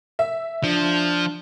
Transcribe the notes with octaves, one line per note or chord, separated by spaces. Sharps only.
E5
F3 D4